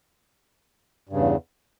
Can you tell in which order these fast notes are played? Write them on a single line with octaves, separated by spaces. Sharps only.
G2 C#3 E2